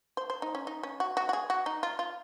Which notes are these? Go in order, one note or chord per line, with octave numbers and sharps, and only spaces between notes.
C5
C5
D#4
C#4
D#4
C#4
F#4
F#4
F#4
G#4
F#4
D#4
F4
F4